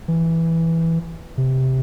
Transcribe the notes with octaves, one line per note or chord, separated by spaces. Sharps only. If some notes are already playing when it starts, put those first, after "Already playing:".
E3
C3